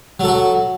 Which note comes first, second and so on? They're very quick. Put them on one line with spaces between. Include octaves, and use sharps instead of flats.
F#3 A4 F#4